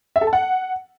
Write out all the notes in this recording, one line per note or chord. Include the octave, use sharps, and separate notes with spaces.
E5
A4
A5
F#5